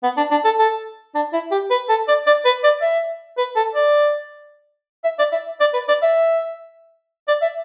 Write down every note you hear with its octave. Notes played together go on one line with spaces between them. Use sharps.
B3
D4
D4
A4
A4
D4
E4
G4
B4
A4
D5
D5
B4
D5
E5
B4
A4
D5
E5
D5
E5
D5
B4
D5
E5
D5
E5